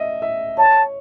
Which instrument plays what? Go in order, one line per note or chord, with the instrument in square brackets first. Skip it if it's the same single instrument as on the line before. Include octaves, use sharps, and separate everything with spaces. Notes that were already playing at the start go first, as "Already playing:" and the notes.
Already playing: [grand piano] D#5 E5
E5
[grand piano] C#5 [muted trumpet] A5